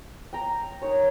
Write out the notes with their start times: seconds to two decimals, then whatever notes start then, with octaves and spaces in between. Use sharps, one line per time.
0.33 G5 A#5
0.82 D#4 A#4 C#5